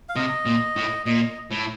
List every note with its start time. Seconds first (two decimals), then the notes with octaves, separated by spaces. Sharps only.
0.09 F5
0.16 C3 D#5
0.46 A#2
0.76 A2
1.06 A#2 D#5
1.51 A2